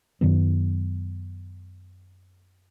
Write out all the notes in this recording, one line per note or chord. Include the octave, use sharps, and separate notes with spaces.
F#2 D#3 F#3 B3